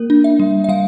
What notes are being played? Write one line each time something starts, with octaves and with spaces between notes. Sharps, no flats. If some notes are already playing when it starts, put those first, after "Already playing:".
Already playing: A#3 A#4
D4
E5
G3
E5
G3 F5